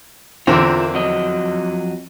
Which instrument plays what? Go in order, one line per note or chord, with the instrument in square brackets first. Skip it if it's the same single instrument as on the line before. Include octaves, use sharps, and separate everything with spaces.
[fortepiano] E2 D3 C4 [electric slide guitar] F4 A#4 E5
[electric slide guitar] F2 F#3 D#5